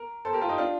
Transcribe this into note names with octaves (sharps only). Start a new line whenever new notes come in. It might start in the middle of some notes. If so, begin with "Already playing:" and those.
Already playing: A#4
A4 C5
G4 A#4
F4 A4
D#4 G4
D4 F4